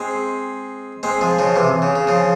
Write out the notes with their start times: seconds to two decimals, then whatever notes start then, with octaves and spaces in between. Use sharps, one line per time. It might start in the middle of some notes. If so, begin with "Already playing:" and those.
Already playing: G#3 C4
1.03 G#3 C4
1.21 F3 G#3
1.39 C#3 F3
1.56 C3 E3
1.82 C#3
1.96 C#3
2.07 C#3 F3